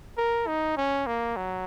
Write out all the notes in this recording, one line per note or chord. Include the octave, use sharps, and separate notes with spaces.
A#4
D#4
C#4
A#3
F#3